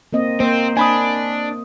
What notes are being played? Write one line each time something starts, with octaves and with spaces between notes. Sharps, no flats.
A#3 C4 D#5
A#3 C4 C5
D4 G#5 B5 D#6